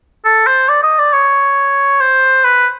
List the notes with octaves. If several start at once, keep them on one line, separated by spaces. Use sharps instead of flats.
A4
C5
D5
D#5
D5
C#5
C5
B4